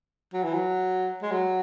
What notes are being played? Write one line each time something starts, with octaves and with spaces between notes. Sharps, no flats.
F#3
E3
F#3
G#3
F#3